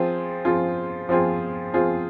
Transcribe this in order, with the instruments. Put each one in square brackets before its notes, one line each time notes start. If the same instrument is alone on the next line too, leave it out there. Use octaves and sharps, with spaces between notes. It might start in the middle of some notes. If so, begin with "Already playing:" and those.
Already playing: [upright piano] F3 C4 F4 G#4
F3 C4 F4 G#4
F3 C4 F4 G#4
F3 C4 F4 G#4